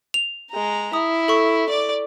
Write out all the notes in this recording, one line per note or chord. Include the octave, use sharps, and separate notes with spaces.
F7
G#3 A#5
E4 D#6
A4 C#6
D5 D6